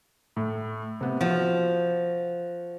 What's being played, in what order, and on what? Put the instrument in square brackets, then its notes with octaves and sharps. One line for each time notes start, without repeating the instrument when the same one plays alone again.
[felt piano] A2
C3 B3
[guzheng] F3 [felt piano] F#4